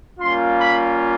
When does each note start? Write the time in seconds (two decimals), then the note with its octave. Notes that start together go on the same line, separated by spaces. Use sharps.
0.19 G3 A#3 C#4 F4 C6
0.59 B5